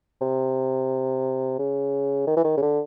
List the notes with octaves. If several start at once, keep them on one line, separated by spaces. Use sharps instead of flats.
C3
C#3
D#3
E3
D#3
C#3
D3